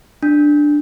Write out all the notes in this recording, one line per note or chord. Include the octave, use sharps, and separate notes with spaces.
D4